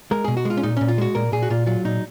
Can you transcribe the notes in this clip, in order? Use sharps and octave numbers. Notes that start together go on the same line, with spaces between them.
G#3 A#4
B2 G#4
F#4
G#3 F4
C#4
A#2 D#4
A#2 C#4
F4
G#3 F#4
A#2 A#4
A#2 G#4
F#4
A#2 F4
F#3 F4
A#2 D#4